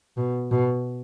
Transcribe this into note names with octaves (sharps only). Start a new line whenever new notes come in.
B2
B2